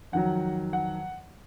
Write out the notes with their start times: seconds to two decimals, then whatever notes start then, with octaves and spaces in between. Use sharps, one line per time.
0.12 F2 D#3 F#3 F#5
0.73 F#5